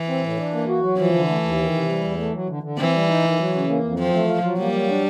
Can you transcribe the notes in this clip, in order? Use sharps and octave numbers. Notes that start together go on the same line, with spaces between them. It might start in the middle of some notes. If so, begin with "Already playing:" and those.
Already playing: E3
C4
A2
D4
A#3
F#4
F#3
E3 F3
D3
A3
D#2
D#3
C3
G3
E2
A3
F#3
D3
D3
E3 C4
G3
D#4
D#3
F#3
C#3
A#3
F2
F3 C4
A3
F4
F#3
G3 A#3
F#3
D4